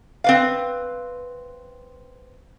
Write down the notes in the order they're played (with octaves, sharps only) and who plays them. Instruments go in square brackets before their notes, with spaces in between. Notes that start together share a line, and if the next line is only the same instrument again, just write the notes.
[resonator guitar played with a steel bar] C4 B4 F5